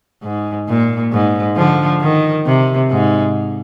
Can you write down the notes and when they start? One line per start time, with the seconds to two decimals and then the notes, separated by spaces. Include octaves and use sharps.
0.23 G#2
0.68 A#2
1.12 G#2
1.56 D3 F3
2.00 D#3
2.46 C3
2.90 G#2